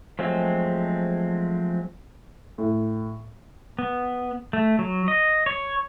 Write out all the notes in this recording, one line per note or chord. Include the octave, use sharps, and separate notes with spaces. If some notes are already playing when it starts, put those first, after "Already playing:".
F3 F#3 G#3 A3 C4
A2
B3
A3
F#3
D#5
C#5